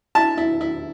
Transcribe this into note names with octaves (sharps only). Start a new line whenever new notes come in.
E4 A5
E4
E4